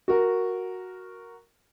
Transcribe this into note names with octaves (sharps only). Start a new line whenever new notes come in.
F#4 A#4